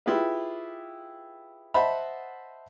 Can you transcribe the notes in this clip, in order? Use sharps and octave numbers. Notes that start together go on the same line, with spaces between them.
E4 F4 G4 G#4 B4
C5 D#5 E5 F#5 A5 B5